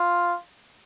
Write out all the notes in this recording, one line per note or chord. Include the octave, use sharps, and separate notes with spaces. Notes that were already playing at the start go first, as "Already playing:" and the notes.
Already playing: F4